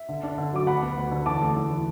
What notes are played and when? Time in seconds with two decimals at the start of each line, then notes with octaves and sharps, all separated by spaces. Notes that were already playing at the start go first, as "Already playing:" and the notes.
Already playing: E5
0.09 D3
0.23 D4
0.38 D3
0.53 F#3 D6
0.67 D2 F#5 B5
0.83 B3
0.97 D2
1.11 D3
1.26 E2 A5 D6
1.41 A3
1.56 E2
1.70 E3